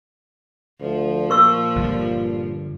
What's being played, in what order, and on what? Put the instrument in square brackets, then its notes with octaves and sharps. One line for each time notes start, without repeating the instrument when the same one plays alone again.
[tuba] D2 [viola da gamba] F3
[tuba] A#2 [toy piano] A#4 C#6 E6
[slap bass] G1 D3 G3